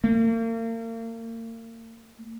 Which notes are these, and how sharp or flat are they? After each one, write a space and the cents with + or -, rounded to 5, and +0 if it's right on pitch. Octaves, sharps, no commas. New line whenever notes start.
A#3 -40